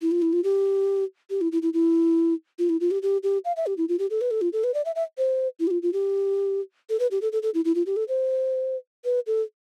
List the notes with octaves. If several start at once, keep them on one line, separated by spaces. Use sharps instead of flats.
E4
F4
E4
F4
G4
G4
E4
E4
E4
E4
F4
E4
F4
G4
G4
G4
F5
E5
G4
E4
F4
G4
A4
B4
A4
F4
A4
B4
D5
E5
E5
C5
E4
G4
F4
F4
G4
A4
B4
G4
A4
A4
A4
E4
E4
F4
G4
A4
C5
B4
A4